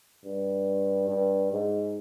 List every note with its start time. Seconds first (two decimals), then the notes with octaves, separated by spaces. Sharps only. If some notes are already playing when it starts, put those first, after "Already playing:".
0.25 G2
1.09 G2
1.52 G#2